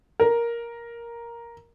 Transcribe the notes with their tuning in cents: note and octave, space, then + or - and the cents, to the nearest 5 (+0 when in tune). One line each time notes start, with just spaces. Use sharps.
A#4 +5